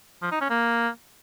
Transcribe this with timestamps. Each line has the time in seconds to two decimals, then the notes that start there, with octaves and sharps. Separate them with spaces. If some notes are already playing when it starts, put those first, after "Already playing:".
0.22 F3
0.31 D#4
0.41 C#4
0.50 A#3